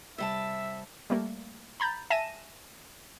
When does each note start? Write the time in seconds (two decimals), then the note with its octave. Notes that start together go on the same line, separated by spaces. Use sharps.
0.18 C3 G3 E5 A5
1.10 G3 A3 A#3
1.80 A#5 B5 G6 A6
2.10 E5 G#5 A5 A#6 D#7 E7